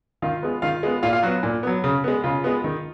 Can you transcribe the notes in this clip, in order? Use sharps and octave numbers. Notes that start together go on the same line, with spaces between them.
D#3 F4 F5
G#3 B3
D#3 F4 F5
G#3 B3
A#2 F4 F5
F4 F5
F#3 B3 F#4
A#2
F#3 B3
C#3
G#3 B3
C#3 F4
G#3 B3
D#3